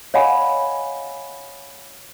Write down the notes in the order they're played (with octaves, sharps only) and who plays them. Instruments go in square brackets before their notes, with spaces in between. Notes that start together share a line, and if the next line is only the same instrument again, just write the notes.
[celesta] C#5 D#5 F5 F#5 G#5 B5